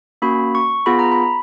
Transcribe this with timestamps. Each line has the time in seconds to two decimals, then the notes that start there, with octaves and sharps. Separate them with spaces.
0.22 A#3 C#4 F#4 B5
0.55 C#6
0.86 B3 F4 G#4 B5
0.99 A#5
1.12 B5